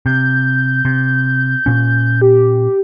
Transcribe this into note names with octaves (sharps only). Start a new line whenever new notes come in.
C3 G6
C3
A#2 C#4
G4